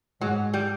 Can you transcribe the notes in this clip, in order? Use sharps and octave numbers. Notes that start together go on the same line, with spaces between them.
G#2 F#3
G3